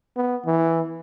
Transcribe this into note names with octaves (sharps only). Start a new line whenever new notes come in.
B3
E3